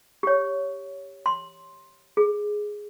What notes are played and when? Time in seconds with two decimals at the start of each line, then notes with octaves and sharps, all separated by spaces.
0.23 G4 C#5
1.26 C6
2.17 G#4